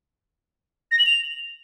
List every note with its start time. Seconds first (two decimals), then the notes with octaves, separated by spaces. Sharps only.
0.91 A#6
0.99 F#7
1.06 F7